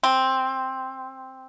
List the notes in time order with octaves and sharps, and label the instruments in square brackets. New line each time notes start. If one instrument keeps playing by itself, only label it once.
[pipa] C4